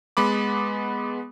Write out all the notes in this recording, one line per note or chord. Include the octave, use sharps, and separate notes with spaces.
G#3 B3 B5 D6